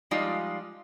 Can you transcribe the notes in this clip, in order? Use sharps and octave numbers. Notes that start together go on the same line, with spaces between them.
F3 G3 G#3 D#4 F4 D5